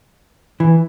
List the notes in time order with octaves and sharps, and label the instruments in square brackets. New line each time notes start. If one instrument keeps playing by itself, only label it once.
[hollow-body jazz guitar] E3